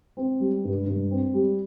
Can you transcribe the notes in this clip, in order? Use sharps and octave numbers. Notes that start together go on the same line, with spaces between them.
C4
G3
G2
G2
C4
G3